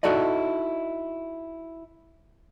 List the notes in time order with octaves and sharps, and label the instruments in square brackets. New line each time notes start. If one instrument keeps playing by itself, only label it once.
[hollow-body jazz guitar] D#4 E4 F#4 A4 D5 D#5